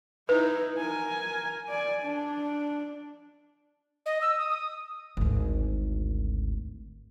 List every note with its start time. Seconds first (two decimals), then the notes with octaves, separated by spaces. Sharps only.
0.29 D#4 E4 B4
0.78 A#4 G#5
1.68 D5 G#5
2.02 D4
4.06 D#5
4.21 E6
4.38 D#6
4.50 D#6
5.17 G#1 D2